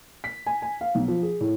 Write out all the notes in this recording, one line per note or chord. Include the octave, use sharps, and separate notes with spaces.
B6
G#5
G#5
F5
B1
F3
G#4
A2